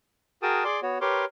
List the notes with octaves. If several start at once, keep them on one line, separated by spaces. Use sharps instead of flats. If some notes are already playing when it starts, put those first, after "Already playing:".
F#4 G#4 A#4 G5 A5 D#6
G#4 D5 C6 D6
B3 F#4 C#5
G4 A#4 B4 C#5 C6 D6